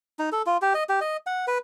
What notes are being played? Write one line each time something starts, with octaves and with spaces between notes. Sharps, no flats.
D#4
A4
F4
G4
D#5
G4
D#5
F#5
B4